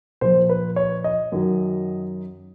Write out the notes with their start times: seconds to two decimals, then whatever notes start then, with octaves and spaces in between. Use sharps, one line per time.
0.21 A#2 F3 C5
0.49 B4
0.76 C#5
1.04 D#5
1.32 F#2 D#3 F#3